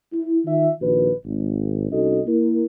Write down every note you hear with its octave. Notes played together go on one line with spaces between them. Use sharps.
E4
D#3 D#4 F4 E5
A#1 D#3 F#4 B4
G#1
C2 C#4 D#4 F#4 A4 D#5
A#3 E4 A#4